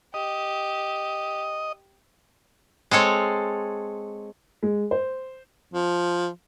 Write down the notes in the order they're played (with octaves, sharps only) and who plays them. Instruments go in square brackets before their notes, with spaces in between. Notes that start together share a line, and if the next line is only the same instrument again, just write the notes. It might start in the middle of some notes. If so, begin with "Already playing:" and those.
[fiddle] G4 [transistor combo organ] D#5
[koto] G#3 C4 A4 C#5
[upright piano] G#3
C5
[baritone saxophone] F3